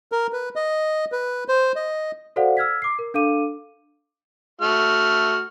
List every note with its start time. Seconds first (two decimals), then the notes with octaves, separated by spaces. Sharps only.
0.12 A#4
0.33 B4
0.56 D#5
1.12 B4
1.48 C5
1.76 D#5
2.36 F#4 A4 C5 D5 F5 F#5
2.57 E6 F6 G#6 B6
2.82 D6 C7
2.99 A#4
3.14 D4 A4 F5 D6 D#7
4.61 A3 F#4 F6